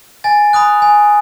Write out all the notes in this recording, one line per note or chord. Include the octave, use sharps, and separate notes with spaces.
G#5 A6
B5 D#6 F#6
G#5